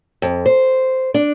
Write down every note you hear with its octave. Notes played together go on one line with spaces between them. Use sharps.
F2
C5
D4